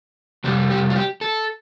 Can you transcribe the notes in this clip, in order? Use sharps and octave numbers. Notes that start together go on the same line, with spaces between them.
F2 C3 G3 G4
G4
F4
G4
A4